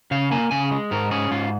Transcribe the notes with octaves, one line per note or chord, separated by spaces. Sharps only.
C#3 F5
A#3 G#5
C#3 G#5
G#3
G#2 A#4
C#4 G#4
G#2 F4